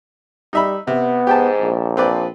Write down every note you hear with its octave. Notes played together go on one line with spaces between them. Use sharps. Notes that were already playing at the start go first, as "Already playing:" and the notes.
G3 D#4 E5 B5
C3 B3
G#2 G4 G5 A5
A#1
F3 C4 B4 D5